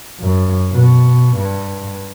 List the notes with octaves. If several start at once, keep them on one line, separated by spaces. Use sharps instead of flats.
F#2
B2
G2